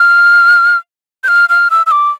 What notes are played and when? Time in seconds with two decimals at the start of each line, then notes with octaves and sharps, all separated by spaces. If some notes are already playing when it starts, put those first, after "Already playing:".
Already playing: F6
1.24 G6
1.28 F6
1.49 F6
1.71 E6
1.86 E6
1.91 D6